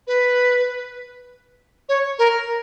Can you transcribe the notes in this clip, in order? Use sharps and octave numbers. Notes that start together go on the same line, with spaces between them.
B4
C#5
A#4